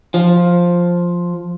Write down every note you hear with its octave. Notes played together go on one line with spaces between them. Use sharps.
F3